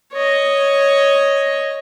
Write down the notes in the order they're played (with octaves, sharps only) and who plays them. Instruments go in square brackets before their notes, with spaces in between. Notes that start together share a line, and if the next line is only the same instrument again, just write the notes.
[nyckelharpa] C#5 D#5